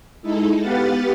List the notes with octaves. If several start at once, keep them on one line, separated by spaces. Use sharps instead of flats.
G#3 D#4 E4 A4
B3 G4 B4 F5 F#5 A6